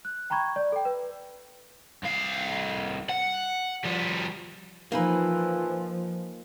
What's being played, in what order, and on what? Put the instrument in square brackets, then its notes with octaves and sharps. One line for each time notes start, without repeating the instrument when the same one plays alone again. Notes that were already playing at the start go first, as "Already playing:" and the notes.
[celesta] F#6
G5 A#5 B5 C#6 G#6
D5
A4 G5
B4
[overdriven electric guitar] C2 F5
F#5
F3 G3
[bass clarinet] E3 [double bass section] F3 [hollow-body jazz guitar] A#3 D#4 B4